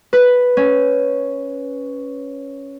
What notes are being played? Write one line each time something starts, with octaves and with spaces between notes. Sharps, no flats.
B4
C#4